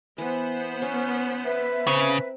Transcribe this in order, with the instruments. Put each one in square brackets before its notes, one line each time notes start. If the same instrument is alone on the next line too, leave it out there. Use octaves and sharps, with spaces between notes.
[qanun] E3 [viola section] B3 C5
[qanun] C#4
[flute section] B4 E5
[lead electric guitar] C#3 [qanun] C4 A#5